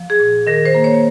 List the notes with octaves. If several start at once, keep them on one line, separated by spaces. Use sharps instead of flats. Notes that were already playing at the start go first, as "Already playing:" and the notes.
Already playing: F3
G#4
A#2
D#3 A#4
C5
A#3
C#5